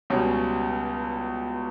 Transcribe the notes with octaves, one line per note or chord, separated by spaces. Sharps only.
C#2 B2 G3 C#4